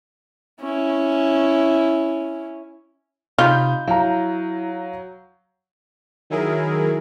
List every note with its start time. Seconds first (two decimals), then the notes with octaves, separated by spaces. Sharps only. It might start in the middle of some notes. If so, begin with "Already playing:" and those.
0.61 C#4 E4
3.39 C3 D#4 F4 B5 G6
3.88 F#3 E4 F5 A#5
6.30 D#3 F#3 E4 G#4 A#4